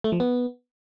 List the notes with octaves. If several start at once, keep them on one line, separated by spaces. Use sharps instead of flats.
A3
F3
B3